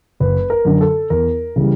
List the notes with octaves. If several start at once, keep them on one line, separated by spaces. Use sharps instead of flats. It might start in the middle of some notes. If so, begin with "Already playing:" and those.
F#1 B4
A#4
F#2 D3
A4
E2 A#4
C#3 E3 G3